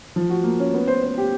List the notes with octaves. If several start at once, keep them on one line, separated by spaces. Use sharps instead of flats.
F3
F#4
A#3
C#4
B3
C5
C5
G4